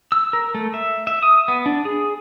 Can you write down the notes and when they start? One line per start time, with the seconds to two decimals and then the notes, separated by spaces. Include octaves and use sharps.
0.12 E6
0.33 A#4
0.54 A3
0.74 E5
1.07 E5
1.22 D#6
1.48 B3
1.66 D4
1.85 G#4